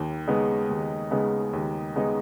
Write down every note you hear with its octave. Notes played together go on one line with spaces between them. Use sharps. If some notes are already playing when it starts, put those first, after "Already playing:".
Already playing: D#2
C#3 G#3 B3 D#4
D#2
C#3 G#3 B3 D#4
D#2
C#3 G#3 B3 D#4